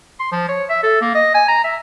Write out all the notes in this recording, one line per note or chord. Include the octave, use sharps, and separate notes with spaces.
C6
F3
C#5
E5
A4
A#3
D#5
G#5
A#5
E5